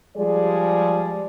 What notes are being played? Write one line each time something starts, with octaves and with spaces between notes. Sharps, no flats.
F3 G3 G#3 G#4 D5